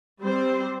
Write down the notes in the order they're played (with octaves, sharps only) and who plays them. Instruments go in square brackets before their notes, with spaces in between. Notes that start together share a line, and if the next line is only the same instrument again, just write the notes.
[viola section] G3 C4 C5